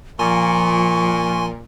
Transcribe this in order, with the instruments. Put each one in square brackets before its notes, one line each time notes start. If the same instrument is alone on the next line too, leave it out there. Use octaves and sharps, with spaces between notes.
[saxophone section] A#2 [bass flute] F3 [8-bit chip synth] G#5 C6 [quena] C#6